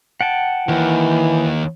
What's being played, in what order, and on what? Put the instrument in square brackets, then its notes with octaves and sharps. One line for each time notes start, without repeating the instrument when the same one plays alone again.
[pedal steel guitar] F#5 G5 A5
[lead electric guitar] D#2 [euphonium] E3